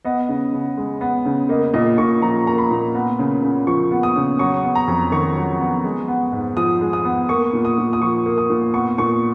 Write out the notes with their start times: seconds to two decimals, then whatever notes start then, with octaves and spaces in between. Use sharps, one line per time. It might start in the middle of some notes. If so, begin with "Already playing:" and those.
0.05 B3 D#5
0.29 C#3
0.53 C#3
0.77 G#3
1.01 B3
1.25 C#3
1.49 A#3 D#5
1.74 A#2 D#5
1.98 A#2 C#6
2.22 F3 A#5
2.46 A#3 A#5
2.58 B5
2.71 A#2
2.95 B3
3.19 C#3
3.43 C#3
3.67 F3 C#6
3.91 B3
4.03 D#6
4.16 C#3
4.39 F#3 C#6
4.64 B3
4.75 A#5
4.88 F2
5.12 D#3 C#6
5.36 F#3
5.61 B3
5.84 G#3
6.08 B3
6.33 G#2
6.57 F3 D#6
6.81 G#3
6.93 D#6
7.05 B3
7.29 A#3 C#6
7.53 A#2
7.65 D#6
7.78 A#2
7.93 D#6
8.02 F3 C#6
8.26 A#3
8.38 D#6
8.50 A#2
8.74 B3 C#6
8.98 A#2 C#6